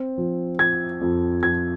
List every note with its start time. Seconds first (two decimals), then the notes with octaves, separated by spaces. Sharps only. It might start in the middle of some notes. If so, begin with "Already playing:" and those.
Already playing: C4
0.18 F3
0.59 F3 G#6
1.01 F2
1.43 F3 G#6